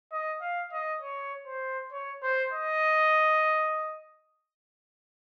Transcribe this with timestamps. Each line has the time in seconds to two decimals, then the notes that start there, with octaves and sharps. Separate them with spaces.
0.12 D#5
0.41 F5
0.73 D#5
1.02 C#5
1.47 C5
1.92 C#5
2.23 C5
2.52 D#5